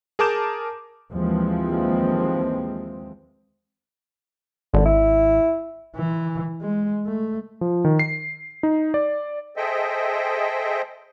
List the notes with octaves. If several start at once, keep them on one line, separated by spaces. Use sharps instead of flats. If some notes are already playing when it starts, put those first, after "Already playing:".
G#4 A#4 A5 D6 G6 E7
D#2 E3 F3 G#3 C4
G#1 D3
E4
E3
G#3
A3
F3
D#3
C7
D#4
D5
G#4 A4 C5 D#5 E5 G5